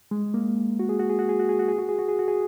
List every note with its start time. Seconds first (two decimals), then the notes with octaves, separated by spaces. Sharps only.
0.11 G#3
0.34 A#3
0.79 F#4
0.89 G#4
0.99 F#4
1.09 G#4
1.19 F#4
1.29 G#4
1.39 F#4
1.49 G#4
1.59 F#4
1.69 G#4
1.79 F#4
1.89 G#4
1.99 F#4
2.08 G#4
2.19 F#4
2.28 G#4